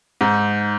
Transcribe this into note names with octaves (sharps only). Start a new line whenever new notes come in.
G#2